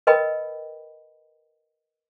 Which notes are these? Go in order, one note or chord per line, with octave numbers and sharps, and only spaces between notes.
A#4 B4 D#5 G5 B5